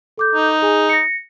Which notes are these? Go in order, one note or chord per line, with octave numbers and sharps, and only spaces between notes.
A4 D6 G6
D#4
G#4 G#5
A#6 C#7